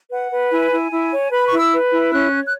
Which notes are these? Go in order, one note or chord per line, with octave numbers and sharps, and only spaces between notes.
B4 F#5
B4
E4 G#5
E4
E4
C#5
B4 B5
C#6
E4
E6
B4
E4
C#4 F#6
C#5
F#6